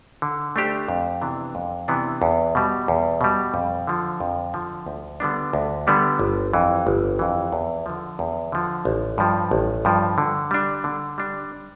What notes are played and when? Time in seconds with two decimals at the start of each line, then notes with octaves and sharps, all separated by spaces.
0.22 D3
0.56 A3 D4 G4 C5
0.88 F2
1.22 C3 E3 B3 D4
1.55 F2
1.88 C3 E3 B3 D4
2.22 E2
2.55 B2 G3
2.88 E2
3.21 B2 G3
3.54 F2
3.87 D3 F3
4.20 F2
4.54 D3 F3
4.86 D2
5.20 D3 G3 B3 D4
5.53 D2
5.87 D3 G3 B3 D4
6.19 G1
6.53 F2 E3
6.87 G1
7.19 F2 E3
7.52 E2
7.86 D3 F3
8.19 E2
8.52 D3 F3
8.85 A1
9.18 G2 F3
9.51 A1
9.85 G2 F3
10.18 D3
10.51 G3 D4
10.84 D3
11.18 G3 D4